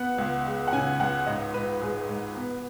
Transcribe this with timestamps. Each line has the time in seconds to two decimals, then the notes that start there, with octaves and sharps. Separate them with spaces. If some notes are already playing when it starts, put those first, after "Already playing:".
Already playing: B3 F#5
0.18 C#2
0.46 G#3
0.67 F#5
0.73 C#3 G#5
0.99 C#2 F#5
1.26 G#2 D#5
1.54 G#2 B4
1.81 G#2 G#4
2.09 G#2
2.36 B3